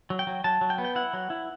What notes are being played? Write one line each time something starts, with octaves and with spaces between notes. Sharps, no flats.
F#3
G5
F#3
F#3 A5
F#3
G5
B3
G5
E4 F#5
F#3
E4